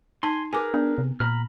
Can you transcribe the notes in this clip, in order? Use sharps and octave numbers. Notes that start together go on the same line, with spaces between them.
D#4 G#5 A5 C6
G#4 A#4 B4 G#5 D6
B3 D4
C3
A#2 A#5 B5 F6